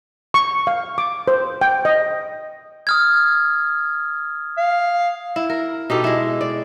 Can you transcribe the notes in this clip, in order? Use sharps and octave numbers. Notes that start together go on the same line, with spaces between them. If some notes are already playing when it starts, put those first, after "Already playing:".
C#6
F5
D6
C5
G5
D#5
D#6 F6 G#6
F5
E4
A#4
B2 D#4 G4 A4
G#3 E4
D5